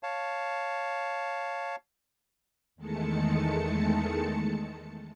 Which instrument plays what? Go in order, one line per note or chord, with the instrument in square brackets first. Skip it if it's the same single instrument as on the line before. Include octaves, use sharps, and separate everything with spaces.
[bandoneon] C#5 F5 A5
[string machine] E2 D#3 G#3 A3 A5 C#7